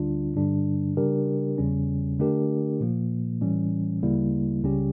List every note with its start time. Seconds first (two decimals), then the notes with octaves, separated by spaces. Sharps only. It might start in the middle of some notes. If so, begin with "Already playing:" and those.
Already playing: D2 D3 G3 D4 F4
0.36 G2 D3 G3 D4
0.97 C#3 G3 D4 G4 A#4
1.58 E2 C#3 G3 C#4
2.19 D3 A3 D4 G4 A#4
2.80 A#2 F3 A#3
3.41 A2 E3 G3 C#4
4.02 D2 C#3 G3 A#3 E4
4.63 C#2 C#3 G3 C#4 G4